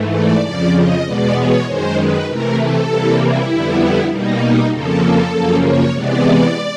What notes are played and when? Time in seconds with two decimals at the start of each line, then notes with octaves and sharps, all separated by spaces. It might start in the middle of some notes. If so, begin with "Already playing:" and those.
Already playing: G#2 E3 A3
0.14 D5
0.44 F2 C#3 F3 D5
0.75 D#5
1.05 E2 B2 G#3 B3 D5
1.35 C#5
1.66 F#2 D#3 G#3 C5
1.97 B4
2.28 C3 E3 A3 A#4
2.58 A4
2.89 C3 E3 G3 A#3
3.19 E4
3.50 F2 D3 G3 B3
4.10 B2 G3 A#3 D#4
4.71 F2 C#3 F3 A#3 A4
5.32 F#2 C#3 F3 A#3
5.63 C#5
5.94 C3 E3 G#3 B3 D5